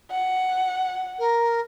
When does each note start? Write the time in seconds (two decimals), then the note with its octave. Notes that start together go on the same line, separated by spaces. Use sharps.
0.11 F#5
1.19 A#4